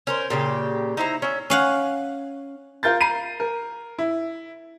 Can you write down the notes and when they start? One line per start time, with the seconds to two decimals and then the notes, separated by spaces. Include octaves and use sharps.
0.07 C#4 A#4 C5
0.30 A#2 C#3 G4
0.97 D#4 E4 C5 A#5
1.22 C#4 E5
1.50 C#4 F5 F#5
2.83 F4 A#4 G6 A6
3.01 A#5 C7 D#7
3.40 A#4
3.98 E4